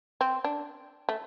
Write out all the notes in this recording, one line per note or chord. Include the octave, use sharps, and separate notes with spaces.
C4
D4
A3